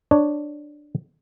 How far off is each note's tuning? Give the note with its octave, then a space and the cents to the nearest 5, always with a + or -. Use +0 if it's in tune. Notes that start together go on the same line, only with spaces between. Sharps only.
D4 +10 C#5 +10